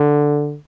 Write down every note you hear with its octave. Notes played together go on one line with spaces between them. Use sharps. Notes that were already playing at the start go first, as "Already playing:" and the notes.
Already playing: D3